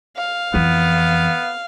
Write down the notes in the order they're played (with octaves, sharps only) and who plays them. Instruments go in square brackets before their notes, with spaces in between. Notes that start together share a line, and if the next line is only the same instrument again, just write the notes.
[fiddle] F5
[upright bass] F2 E3 [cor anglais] B3